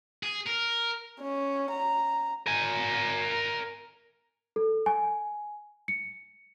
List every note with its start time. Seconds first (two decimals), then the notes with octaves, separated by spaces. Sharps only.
0.23 G#4
0.46 A#4
1.20 C#4
1.71 A#5
2.46 A#4 G#5
4.56 A4
4.86 G#5
5.88 C#7